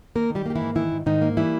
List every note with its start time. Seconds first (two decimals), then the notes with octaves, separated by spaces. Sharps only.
0.15 D#3 A#3 A#4
0.30 D#3
0.35 G3 G4
0.46 A#3 G4
0.56 E3 E4
0.61 G#2
0.76 D#3 E3 E4
0.92 G#2
1.06 G#2 D#3 D#4
1.22 A#3
1.37 E3 G3 E4